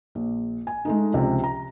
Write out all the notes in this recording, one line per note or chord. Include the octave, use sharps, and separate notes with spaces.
A#1
G#5
G#3 A3 D#4
C#2 C3 F3
A#5